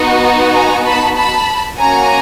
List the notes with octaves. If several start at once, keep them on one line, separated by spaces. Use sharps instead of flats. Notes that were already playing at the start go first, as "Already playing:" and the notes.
Already playing: B3 D#4 F#4
G#5 A#5
A5 B5
A5 B5
A#3 C#4 F#4 G#5 A#5